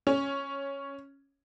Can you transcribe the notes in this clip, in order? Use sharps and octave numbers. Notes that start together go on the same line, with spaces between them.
C#4